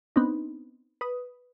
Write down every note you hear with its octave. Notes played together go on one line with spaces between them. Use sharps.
B3 C4 D4 D#4
B4 D#6